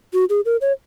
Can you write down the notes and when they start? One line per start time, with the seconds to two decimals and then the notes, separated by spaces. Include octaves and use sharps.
0.14 F#4
0.30 G#4
0.45 A#4
0.61 C#5